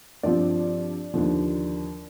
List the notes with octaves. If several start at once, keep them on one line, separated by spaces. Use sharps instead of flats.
G2 F3 C4 F4 D5
D#2 D3 F3